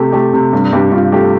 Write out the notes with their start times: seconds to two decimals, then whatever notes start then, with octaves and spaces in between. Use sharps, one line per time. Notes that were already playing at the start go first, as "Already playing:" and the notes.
Already playing: C3 A3 G4 A4
0.12 A3 G4
0.33 C3
0.53 G2
0.72 G2 G4
0.92 G2 F4
1.12 A3 G4